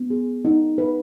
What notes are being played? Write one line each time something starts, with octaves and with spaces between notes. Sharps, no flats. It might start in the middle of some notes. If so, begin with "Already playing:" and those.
Already playing: B3
G#4
D#4
B4